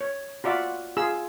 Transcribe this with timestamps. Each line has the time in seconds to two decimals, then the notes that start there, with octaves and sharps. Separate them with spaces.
0.01 C#5
0.44 F4 F#4 D5 E5
0.97 F4 G#4 E6